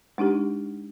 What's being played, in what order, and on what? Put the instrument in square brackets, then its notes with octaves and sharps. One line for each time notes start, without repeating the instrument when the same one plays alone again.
[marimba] G#3 D4 D#4 G4